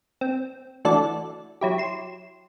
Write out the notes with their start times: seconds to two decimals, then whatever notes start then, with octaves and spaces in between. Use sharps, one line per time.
0.21 C4
0.85 E3 A3 D4 F#4 A4 D5
1.61 F#3 E4 G4
1.78 C6 E7